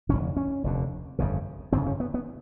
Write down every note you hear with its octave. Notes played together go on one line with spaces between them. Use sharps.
F1 D#2 D3 C#4
C#4
F1 D#2 D3
G1 F2 C#3
G1 F2 C#3 C4
C#4
B3
B3